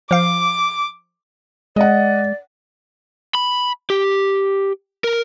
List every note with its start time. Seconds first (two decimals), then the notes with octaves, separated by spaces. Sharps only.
0.11 F3 F5 D6
1.76 G#3 D5 D#5 F#5
3.35 B5
3.90 G4
5.04 A#4